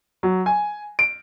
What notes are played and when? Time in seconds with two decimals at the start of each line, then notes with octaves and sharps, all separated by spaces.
0.23 F#3
0.46 G#5
0.99 D7